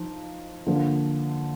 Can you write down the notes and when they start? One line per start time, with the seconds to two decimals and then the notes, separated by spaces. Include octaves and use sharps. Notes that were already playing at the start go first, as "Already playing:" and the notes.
Already playing: F3 D#4
0.67 D3 F3 A#3